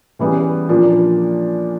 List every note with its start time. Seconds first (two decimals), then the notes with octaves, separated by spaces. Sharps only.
0.19 C#3 E3 G3 B3
0.69 A#2 F3 A#3 D4 F4